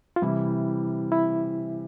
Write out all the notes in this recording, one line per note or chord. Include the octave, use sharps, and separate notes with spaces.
F4
C3 E3 G3 E4
E4